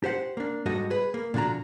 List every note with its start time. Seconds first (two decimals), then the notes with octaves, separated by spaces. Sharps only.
0.04 G4 C5 F#5
0.37 A#3 D4
0.66 G#2 G3 F#4 A4 D#5
0.90 G#4 B4
1.14 A#3
1.34 A#2 D3 F3 D4 F#4 A#5